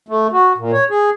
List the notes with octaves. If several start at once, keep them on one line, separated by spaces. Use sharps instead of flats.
A3
F#4
A#2
C#5
G#4